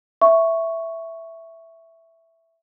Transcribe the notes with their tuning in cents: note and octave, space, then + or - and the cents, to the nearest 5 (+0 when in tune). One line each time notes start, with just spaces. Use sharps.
E5 +0 C#6 +0